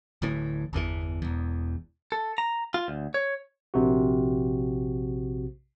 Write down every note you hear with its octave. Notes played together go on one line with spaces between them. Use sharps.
D1 D2 A2 E3
G1 E2 C#3 E3
E1 E2
A4
A#5
F4
D2
C#5
A#1 C3 F#4